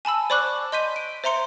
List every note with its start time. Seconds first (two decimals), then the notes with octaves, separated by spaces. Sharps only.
0.05 G#5 A5 B5 E6
0.30 C5 D5 B5 C#6 D6 F#6
0.72 D#5 C6 G6 B6 D#7
0.96 D7
1.24 C5 E5 A#5 C6 C#7